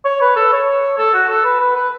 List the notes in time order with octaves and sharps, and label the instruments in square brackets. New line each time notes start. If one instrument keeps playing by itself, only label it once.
[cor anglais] C#5
B4
A4
C#5
A4
F#4
A4
B4
B4
B4